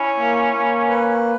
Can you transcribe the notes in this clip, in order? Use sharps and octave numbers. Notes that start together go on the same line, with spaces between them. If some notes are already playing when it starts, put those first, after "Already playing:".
Already playing: C#4 E4
A#3
A#3
B4